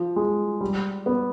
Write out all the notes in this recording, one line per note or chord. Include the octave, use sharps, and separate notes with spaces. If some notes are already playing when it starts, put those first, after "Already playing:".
Already playing: F3
G#3
G3
B3